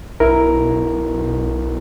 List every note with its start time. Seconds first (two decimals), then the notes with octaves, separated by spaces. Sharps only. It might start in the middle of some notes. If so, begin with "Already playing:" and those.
0.20 B1 E4 A#4